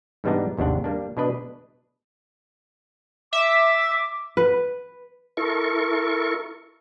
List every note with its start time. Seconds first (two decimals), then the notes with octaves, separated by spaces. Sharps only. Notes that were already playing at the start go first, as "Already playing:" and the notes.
0.24 G#2 E3 G3 B3 D4 D#4
0.57 G#1 D#2 C3 D4 F#5
0.84 G3 A#3 D4
1.17 B2 D4 B4 D#5
3.33 E5 D6
4.37 B4
5.37 E4 A4 A#4 C#6